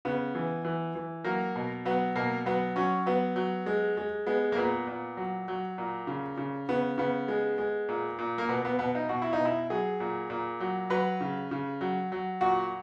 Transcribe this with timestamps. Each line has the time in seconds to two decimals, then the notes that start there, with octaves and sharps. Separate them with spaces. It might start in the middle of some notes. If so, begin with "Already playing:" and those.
0.05 C#3 B3
0.35 E3
0.65 E3
0.95 E3
1.24 F#3 A#3
1.56 B2
1.85 F#3 B3
2.16 B2 A#3
2.46 F#3 B3
2.76 F#3 C#4
3.06 F#3 B3
3.36 F#3
3.66 G#3
3.97 G#3
4.26 G#3 B3
4.52 A#3
4.56 A#2 B3
4.87 A#2
5.17 F#3
5.48 F#3
5.78 A#2
6.07 C#3
6.37 C#3
6.69 C#3 B3
6.98 C#3 B3
7.28 G#3
7.58 G#3
7.89 A#2
8.19 A#2
8.38 A#3
8.49 B2 B3
8.65 B3
8.79 B2 B3
8.95 D#4
9.09 B2 F#4
9.22 E4
9.33 D#4
9.40 B2
9.45 E4
9.70 F#3 G#4
10.00 A#2
10.30 A#2
10.60 F#3
10.90 F#3 B4
11.21 C#3
11.51 C#3
11.81 F#3
12.12 F#3
12.41 A#2 F#4